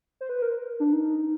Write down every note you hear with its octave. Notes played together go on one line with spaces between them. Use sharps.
C5
B4
A#4
D4
D#4